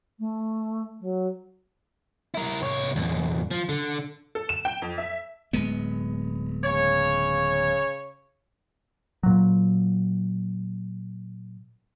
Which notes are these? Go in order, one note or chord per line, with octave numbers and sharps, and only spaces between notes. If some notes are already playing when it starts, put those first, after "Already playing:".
A3
F#3
E4 A#4
C2 C#5
E2 G2
F3
D3
A4
E7
G5
F2
E5
D1 G#3 B3
C#3 C#5
A#2 F#3